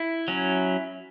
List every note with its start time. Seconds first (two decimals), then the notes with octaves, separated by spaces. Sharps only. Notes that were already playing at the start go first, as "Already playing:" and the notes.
Already playing: E4
0.28 F#3 C#4